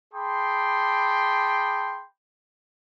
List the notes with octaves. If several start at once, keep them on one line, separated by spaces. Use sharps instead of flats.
G#4 G5 A5 B5 C6 D6